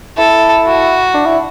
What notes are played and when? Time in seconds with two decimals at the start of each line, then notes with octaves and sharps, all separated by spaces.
0.18 E4 A4
0.66 F#4
1.14 D4
1.26 E4